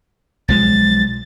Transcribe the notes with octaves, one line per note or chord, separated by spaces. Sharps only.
B1 F3 G#3 A6